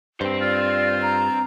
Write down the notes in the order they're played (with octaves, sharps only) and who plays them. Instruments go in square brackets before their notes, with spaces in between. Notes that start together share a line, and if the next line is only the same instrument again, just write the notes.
[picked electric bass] G2 [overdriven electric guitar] C4 C5
[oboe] F4 [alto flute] D5
[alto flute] A#5